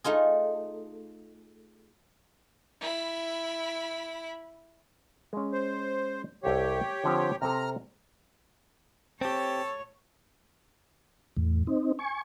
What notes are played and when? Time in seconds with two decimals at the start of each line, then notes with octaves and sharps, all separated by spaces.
0.04 A3 D#4 F4 G#4
2.81 E4 B5
5.33 G#3 C#4
5.53 C5
6.43 C2 G4 A4 C#5 F5
7.04 D3 F3 C4
7.42 C3 C4 A4 A#5 F6
9.21 C4 G4 A4 C#5 A5
11.37 E2 A2
11.67 C4 D#4
11.99 G#5 C#6